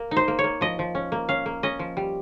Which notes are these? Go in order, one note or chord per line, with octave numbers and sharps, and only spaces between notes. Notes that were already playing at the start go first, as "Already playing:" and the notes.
Already playing: A#3 A#4
D#4
C5
A#3
C#5
A#3
F3 D#5
F3
C#4
A#3
C#4 F5
A#3
C#4 D#5
F3
G3